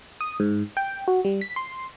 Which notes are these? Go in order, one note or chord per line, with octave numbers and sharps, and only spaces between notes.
D#6
G#2
G5
F#4
G3
B6
C6